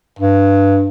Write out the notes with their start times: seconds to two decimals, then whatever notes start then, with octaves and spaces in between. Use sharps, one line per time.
0.19 G2